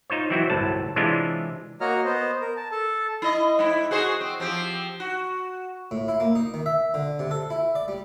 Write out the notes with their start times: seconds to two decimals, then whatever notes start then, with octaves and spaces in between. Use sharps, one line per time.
0.10 D#4 F4 C5 C#5
0.30 E3 F#3 C4 E4 F#4
0.50 G1 C2 A2 C3 F#3 A5
0.96 C3 E3 G#3 C#4 D4 F4
1.81 A#3 F#4 C#5 D#5 A#5 F6
2.05 B3 C5 D#5
2.41 A#4
2.56 A5
2.71 A4 A5
3.22 E4 D#5
3.59 G#2 E4
3.91 F#4 G#4 C5
4.21 C4
4.40 F3 C4 G4
5.00 F#4
5.91 A2
6.08 E4
6.20 A#3
6.35 D#4
6.54 D#3
6.66 E5
6.94 D3
7.19 C3
7.31 A4
7.50 E4
7.75 D5
7.88 G3